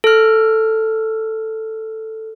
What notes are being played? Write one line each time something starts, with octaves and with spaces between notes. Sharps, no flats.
A4 F6